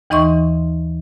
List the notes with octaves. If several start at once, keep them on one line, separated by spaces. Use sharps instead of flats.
D#2 E3 D#4 D#5 C6 C#6